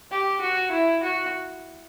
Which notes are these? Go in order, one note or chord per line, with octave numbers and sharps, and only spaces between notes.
G4
F#4
E4
F#4